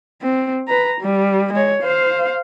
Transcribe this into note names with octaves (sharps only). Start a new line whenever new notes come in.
C4
B4 A#5
G3
G#3 C#5
C5 F5